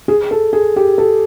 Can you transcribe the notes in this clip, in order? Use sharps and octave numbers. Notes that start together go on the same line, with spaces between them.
G#4
A4
G#4
G4
A4